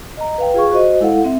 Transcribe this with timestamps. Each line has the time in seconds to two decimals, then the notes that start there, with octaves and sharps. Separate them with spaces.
0.17 D#5 A#5
0.38 B4 F5 G5
0.54 F4 G#4 F5 C#6
0.72 F#4 C5 D#5
1.00 G#3 E4 A4 F5 F#5
1.24 C4 E5